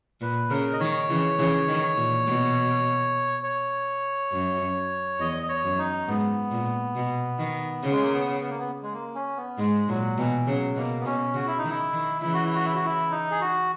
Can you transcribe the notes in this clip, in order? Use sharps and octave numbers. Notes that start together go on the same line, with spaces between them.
A#2 B4
C#3 A#4
D#5
D#3 C#5
C#3 E3
C#3 E3
D#3
A#2
B2
C#5
F#2
E2 D#5
D#5
C#5
F#2
D#4
G#2 B3
A#2
B2
D#3
C#3
G#3
A#3
B3
B3
A#3
B3
G#3
A#3
C#4
B3
G#2 G#3
A#2 F#3
B2 E3
C#3 F#3
B2 A#3
B3
B2 C#4
C#3 F#4
E4
D#4
D#3
E4
D#3
C#3 E3 E4
F#4
E4
F#4
E4
F#4
E4
D#4
G#4
F#4